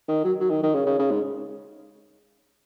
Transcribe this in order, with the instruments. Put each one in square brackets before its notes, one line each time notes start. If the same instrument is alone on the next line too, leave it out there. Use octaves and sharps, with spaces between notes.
[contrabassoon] D#3
F#3
F#3
D#3
D#3
C#3
C#3
C#3
G#2